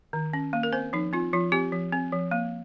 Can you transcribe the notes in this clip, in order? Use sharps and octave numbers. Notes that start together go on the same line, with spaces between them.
D#3
C#4
A#3
A#4
C4 C5
F3 D#4
C4 F4
F3 F4
C4 G4
F3
C4
F3
A#3